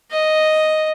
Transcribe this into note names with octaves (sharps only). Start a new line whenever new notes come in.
D#5